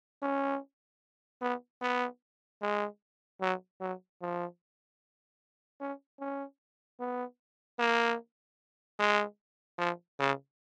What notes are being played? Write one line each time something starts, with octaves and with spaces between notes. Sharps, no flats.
C#4
B3
B3
G#3
F#3
F#3
F3
C#4
C#4
B3
A#3
G#3
F3
C#3